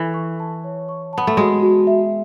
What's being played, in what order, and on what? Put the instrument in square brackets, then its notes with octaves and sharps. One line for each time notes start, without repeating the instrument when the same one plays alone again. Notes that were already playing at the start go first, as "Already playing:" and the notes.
Already playing: [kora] E3 [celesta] A4
[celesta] C#6
A5
C#5
C#6
[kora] B3 [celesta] A5
[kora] A3
[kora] G#3 [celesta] F#4
[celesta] F#4
E5